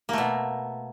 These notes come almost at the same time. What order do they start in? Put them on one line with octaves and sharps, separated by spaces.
A#3 A3 B2